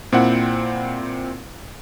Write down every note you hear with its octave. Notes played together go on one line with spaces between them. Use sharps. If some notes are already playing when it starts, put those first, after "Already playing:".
A#2 C4 E4 F#5